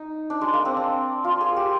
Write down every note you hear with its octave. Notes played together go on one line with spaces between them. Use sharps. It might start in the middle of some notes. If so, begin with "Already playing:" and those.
Already playing: D#4
D4
G#3
A#3
C4
D4
F4
G#4
G4